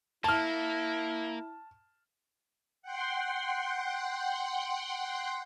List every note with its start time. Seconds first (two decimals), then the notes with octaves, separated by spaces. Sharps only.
0.24 A#3 E4 A5 F6
2.82 F#5 G5 C6